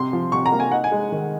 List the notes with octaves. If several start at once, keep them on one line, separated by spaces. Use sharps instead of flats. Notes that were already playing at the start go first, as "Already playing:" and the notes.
Already playing: C3 C6
F3
C3 C#6
A#5
A#3
G#5
D#4 F#5
G#5
G#3
D#3